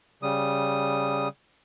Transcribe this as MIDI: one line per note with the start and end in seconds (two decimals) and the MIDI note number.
0.23 1.28 49
0.23 1.28 55
0.23 1.28 87